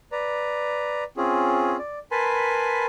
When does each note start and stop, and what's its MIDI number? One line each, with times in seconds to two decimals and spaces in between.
0.12 1.04 71
0.12 1.04 74
0.12 1.04 82
1.17 1.77 60
1.17 1.77 61
1.17 1.77 65
1.17 1.77 68
1.79 1.99 74
2.11 2.86 70
2.11 2.86 71
2.11 2.86 80
2.11 2.86 81
2.11 2.86 83
2.11 2.86 84